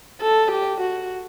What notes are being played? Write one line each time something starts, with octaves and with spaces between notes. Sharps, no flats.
A4
G4
F#4